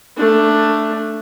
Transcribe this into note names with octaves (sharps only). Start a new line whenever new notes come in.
A3 D4